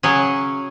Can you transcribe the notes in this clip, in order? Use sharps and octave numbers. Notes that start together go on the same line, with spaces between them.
C#3 F#3 C#4 G#4